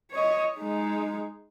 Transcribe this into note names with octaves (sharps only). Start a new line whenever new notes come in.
C#5 D#5
G#3 D#4